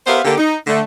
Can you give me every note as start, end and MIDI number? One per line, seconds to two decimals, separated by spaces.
0.07 0.19 59
0.07 0.19 67
0.07 0.19 70
0.07 0.19 72
0.07 0.19 76
0.07 0.19 77
0.25 0.35 50
0.25 0.35 58
0.25 0.35 67
0.38 0.56 63
0.67 0.81 50
0.67 0.81 57